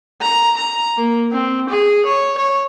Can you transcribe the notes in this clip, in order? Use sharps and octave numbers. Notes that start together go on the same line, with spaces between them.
A#5
A#5
A#3
C4
G#4
C#5
C#5